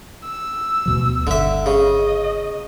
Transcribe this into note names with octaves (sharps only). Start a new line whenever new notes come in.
E6
D2 B2 F3
G1 D3 E5
C#3 D#5